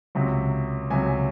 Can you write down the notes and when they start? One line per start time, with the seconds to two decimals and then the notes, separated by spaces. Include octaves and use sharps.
0.15 C#2 C3 F#3
0.90 C#2 C3 F#3 G#5